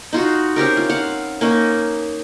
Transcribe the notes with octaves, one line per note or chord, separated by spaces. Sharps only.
D#4 F4 F#4
C4 C#4 G4 A#4
F4
F5 F#5
A#3 C#4 D#4